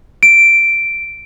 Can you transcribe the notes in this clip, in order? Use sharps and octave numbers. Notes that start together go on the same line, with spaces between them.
D7